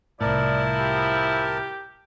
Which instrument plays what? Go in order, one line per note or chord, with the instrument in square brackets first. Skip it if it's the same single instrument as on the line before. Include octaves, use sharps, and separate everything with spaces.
[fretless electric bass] C2 A2 [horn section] F3 E4 [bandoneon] A#4 A5 [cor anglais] D5
[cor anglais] G4